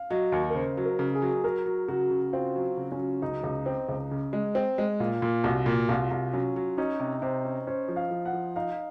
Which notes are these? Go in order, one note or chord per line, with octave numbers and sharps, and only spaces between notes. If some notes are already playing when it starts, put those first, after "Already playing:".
Already playing: F5
F#3 D#5
D#2
A#4
C#3 C5
F#3
A#4
C#3
G#4
F#3
F#3 A#4
F#3
C#3 F#4
C#3
C4 F4
F#3
C#3
C#4
F#3
C#2 D#4
C#2
C4
C#2
C#3
G#3
C4
G#3
A#2 F4
A#2
C2 F#4
A#2
C2 F4
C2
F#3 C#4
F#3
C#4 D#4
C3
C3 C5
C#4
C#4 C5
F3
F5
F3
F#5
F3
D#4 F5